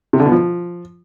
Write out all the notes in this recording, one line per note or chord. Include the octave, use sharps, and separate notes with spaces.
C3
D3
B2
F3